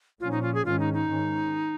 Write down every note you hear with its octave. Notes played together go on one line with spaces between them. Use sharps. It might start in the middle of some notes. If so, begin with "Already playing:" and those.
A#2 F3 C#4 F4
D#4
F4
G#4
G#2 D#3 C#4 F4
D#4
D#4
G#2 D#3 C#4